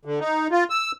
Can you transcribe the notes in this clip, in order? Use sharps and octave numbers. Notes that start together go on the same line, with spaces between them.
D3
D#4
F4
E6